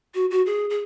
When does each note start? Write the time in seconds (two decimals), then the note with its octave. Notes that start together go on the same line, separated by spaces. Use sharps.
0.15 F#4
0.31 F#4
0.46 G#4
0.70 G#4